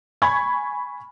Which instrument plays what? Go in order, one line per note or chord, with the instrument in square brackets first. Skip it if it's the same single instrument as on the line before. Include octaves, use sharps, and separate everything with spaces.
[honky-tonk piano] G#5 B5 C#6 G#6